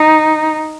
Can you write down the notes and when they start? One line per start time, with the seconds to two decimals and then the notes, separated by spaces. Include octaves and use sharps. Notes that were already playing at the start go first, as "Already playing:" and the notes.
Already playing: D#4